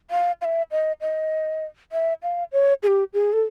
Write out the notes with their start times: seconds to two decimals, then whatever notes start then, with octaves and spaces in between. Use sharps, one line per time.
0.11 F5
0.41 F5
0.45 E5
0.71 D#5
1.01 D#5
1.92 E5
2.23 F5
2.52 C#5
2.83 G#4
2.87 G4
3.14 G#4
3.33 A4